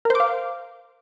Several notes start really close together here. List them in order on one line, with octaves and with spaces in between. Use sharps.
A#4 C5 D6 F5